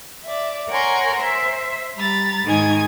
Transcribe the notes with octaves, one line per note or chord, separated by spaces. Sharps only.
D5 E5
A#4 C#5 F#5 G#5 A#5 C6
C5 E5
G3 A#5 B5 A6
G#2 D#3 D#4 G#5 D#6 G#6